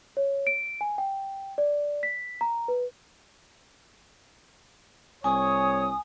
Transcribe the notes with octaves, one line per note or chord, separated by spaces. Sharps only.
C#5
D7
G#5
G5
D5
B6
A#5
B4
C2 C#5 G#5 D#6